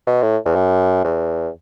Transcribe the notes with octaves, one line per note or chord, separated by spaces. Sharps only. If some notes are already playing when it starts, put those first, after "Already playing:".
B2
A2
E2
F#2
E2